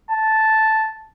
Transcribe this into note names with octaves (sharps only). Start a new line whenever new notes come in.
A5